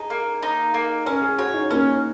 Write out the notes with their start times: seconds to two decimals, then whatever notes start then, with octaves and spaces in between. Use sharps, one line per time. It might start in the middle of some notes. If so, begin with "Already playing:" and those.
Already playing: D#4 G#4
0.10 A#3
0.43 D#4
0.74 A#3
1.06 C#4 A#4
1.22 G#4
1.39 F#4 C#5
1.54 D#4
1.70 A#3 C#4